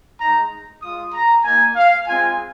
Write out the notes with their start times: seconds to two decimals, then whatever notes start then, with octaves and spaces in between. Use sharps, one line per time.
0.20 G#3 D#4 A#5
0.82 G#3 F4 D#6
1.13 A#5
1.44 A#3 D#4 G#5
1.76 F5
2.06 G#3 C4 F4 G#5